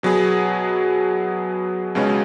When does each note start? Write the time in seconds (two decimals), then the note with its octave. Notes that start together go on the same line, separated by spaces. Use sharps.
0.03 B2 F#3 B3 G#4
1.95 C#2 B2 G#3 C#4